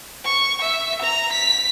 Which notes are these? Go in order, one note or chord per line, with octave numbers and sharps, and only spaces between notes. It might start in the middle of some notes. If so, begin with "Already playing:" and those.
C#6
E5
A#5
B6